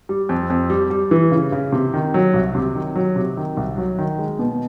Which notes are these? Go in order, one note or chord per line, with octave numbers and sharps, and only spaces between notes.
G3
F2
F2
G3
G3
E3
C#3
C#3
C3
D#3
F#3
C2
C3
D#3
F#3
C3
D#3
C2
F#3
D#3
G#3
B2